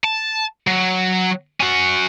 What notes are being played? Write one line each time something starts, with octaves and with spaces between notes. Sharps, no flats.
A5
F#3
C#4 F#4